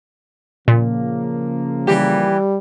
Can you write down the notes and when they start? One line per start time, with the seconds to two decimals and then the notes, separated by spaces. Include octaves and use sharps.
0.68 A#2 C#3 F3 A#3
1.87 E3 G3 G4